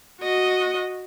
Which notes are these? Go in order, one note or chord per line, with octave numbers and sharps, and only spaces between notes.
F#4 D#5